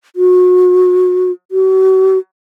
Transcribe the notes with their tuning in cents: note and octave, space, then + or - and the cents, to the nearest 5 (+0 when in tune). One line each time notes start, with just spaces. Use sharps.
F#4 -30
F#4 +40